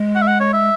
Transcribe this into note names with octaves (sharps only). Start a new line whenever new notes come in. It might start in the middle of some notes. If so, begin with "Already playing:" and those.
Already playing: G#3
F#5
E5
F#5
C#5
E5